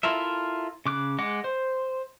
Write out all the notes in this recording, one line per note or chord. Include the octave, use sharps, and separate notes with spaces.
E4 F4 A4 A#4 E5
C#3 D6 F#6
G#3 D#5 F#5 D6
C5